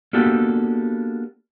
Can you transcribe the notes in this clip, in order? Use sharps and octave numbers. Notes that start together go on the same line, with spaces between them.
A#3 B3 D4 F#4 G4 A4